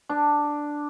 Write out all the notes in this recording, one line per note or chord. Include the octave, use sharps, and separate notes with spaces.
D4